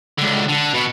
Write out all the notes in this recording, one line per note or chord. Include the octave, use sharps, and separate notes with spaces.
C#2 D3
D3
B2 B3